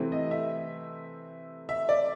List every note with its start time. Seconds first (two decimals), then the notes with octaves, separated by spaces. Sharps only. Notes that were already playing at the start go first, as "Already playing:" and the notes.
Already playing: C3 E3 A3 C4
0.12 D#5
0.31 E5
1.69 E5
1.89 D5